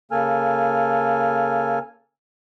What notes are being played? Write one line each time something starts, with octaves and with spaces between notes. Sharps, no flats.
C#3 A#3 A4 G#5 F6